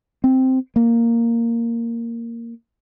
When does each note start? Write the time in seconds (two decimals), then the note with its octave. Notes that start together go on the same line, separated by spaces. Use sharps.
0.24 C4
0.76 A#3